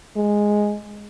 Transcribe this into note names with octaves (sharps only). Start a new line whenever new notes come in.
G#3